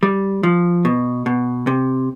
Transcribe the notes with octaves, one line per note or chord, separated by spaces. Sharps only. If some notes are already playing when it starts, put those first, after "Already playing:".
G3
F3
B2
B2
C3